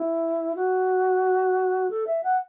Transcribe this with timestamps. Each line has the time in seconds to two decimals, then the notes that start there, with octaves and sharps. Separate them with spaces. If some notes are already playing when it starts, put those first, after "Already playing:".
Already playing: E4
0.55 F#4
1.90 A4
2.07 E5
2.23 F#5